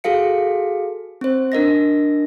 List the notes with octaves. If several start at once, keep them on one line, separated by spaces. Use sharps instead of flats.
F#4 G#4 A4 F5 C#7
C4 C5
D4 A#4 D#5 A#6